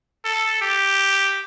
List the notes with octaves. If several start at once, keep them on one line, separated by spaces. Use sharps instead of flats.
A4
G4